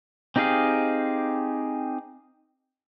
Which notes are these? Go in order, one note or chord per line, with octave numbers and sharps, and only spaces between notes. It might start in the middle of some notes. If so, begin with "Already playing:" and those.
C4 D#4 G4 G#4 F5